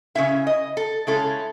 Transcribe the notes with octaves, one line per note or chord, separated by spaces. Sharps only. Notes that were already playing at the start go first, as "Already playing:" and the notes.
C#3 G#3 C#4 E4 E5
D#5
A4
C#3 G#3 C#4 E4 A4